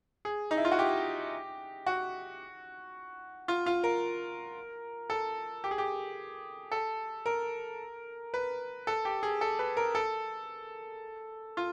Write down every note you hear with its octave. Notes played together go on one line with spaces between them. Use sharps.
G#4
D#4
E4
F4
F#4
G4
F#4
F4
F4
A#4
A4
G4
G#4
G4
A4
A#4
B4
A4
G4
G#4
A4
B4
A#4
A4
F4